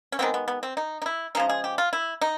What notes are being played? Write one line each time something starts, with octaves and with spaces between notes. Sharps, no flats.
C#4
D#3 G#3 B3 C4
B3
B3
C4
D#4
D#4
E4
C#3 F3 G#3 D#4
G#4
G4
F4
E4
D#4